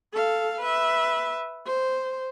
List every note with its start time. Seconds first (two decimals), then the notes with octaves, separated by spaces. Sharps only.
0.13 A4 F5
0.61 B4 E5
1.66 C5